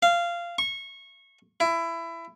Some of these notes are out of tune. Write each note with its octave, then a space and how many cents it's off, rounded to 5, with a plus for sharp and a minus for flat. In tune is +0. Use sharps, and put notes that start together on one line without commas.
F5 -15
C#6 -20
E4 +20